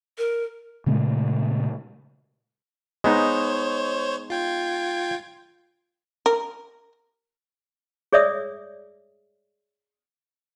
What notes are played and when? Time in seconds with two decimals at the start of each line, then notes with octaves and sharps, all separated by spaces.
0.18 A#4
0.86 A#2 C#3 G#3 A3
3.04 G#3 B3 D#4 C5 C#5
4.30 F4 G5 G#6
6.26 A#4
8.13 G#4 C#5 D5 E5 D#6 E6